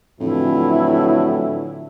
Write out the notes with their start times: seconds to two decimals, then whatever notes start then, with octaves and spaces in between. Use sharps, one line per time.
0.20 F2 A2 D3 E3 F#3 E4